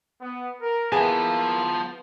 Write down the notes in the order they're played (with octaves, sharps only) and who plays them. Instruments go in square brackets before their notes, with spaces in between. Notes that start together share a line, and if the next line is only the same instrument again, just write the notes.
[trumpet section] B3
A#4
[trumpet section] A#3 E4 E5 [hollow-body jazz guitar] B3 G#4 G#5 [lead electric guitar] F4 A5